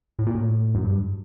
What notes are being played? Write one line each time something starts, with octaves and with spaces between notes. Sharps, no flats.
A2
A#2
A2
F#2
G2